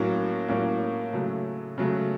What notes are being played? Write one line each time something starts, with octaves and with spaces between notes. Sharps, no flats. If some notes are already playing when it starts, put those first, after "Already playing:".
Already playing: A2 F#3 A#3 C#4
A2 F#3 A#3 C#4
C#3 F#3 A3
C#3 F#3 A3